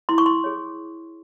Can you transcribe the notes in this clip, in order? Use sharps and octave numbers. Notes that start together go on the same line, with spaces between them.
E4 C6
C#6
C6
G#4 C#5